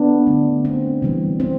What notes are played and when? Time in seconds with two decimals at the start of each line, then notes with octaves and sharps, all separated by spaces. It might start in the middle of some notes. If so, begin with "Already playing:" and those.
Already playing: B3 D4
0.27 D3 A3
0.65 C4
1.02 C3 E3 G3
1.40 C4